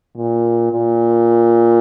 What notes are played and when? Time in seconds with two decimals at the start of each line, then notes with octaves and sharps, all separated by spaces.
0.17 A#2
0.72 A#2